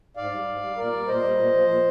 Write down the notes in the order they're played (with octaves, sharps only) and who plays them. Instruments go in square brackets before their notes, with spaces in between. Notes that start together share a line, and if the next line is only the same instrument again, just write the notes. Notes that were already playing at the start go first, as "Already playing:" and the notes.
[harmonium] G#2 D5 F5
G3
G#2
G3
A#2 A#4 D5
G3
A#2 C5 D#5
G3
A#2
F3
A#2